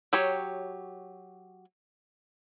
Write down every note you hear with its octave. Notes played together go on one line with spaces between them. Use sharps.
F#3 G4 C#5